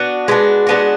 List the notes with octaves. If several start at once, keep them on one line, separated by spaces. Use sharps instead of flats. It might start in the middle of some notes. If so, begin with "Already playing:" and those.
Already playing: B3 D4 F#4
G#3 B3 D4 F#4
G#3 B3 D4 F#4